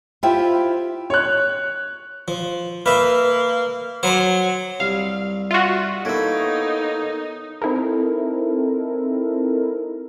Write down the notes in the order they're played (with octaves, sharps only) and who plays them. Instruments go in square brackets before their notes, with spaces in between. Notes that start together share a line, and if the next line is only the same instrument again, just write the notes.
[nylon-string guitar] E4 F4 G4 C5 E5 G5
[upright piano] C#5 F#6
[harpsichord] F3
[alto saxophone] A#3 [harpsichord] B4 E5
[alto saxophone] F#3 [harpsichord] C5 A#5 D6
[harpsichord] C2 [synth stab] F5
[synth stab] F4 F#4 [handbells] E5
[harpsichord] A#3 E4 [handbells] B3 A4 C#5 [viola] D#4
[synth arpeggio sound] C4 D#4 E4 A4 A#4